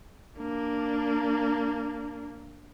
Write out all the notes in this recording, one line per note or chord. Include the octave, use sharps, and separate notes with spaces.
A#3 D4